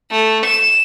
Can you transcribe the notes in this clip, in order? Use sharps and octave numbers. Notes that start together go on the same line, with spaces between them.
A3
E7